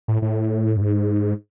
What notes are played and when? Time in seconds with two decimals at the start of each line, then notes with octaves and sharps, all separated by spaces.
0.08 A2
0.22 A2
0.77 G2
0.81 G#2